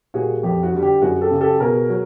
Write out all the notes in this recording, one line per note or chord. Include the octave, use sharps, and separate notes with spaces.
A#2 G3 F#4 G#4
F2 G4
F#4
D3 G3
G4
F#2 F#4 G#4
G4 A4
C#3 F#3
G4 A4
B2 G#4 A#4
F#3